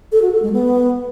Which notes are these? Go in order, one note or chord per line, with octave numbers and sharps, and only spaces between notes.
A4
F#4
A4
G#3
B3